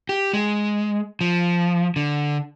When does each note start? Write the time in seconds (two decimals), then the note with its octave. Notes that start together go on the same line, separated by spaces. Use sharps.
0.09 G4
0.33 G#3
1.21 F3
1.96 D3